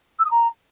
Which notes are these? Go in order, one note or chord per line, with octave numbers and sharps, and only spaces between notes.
E6
D#6
A#5